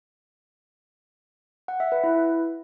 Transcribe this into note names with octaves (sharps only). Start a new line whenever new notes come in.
F#5
E5
B4
E4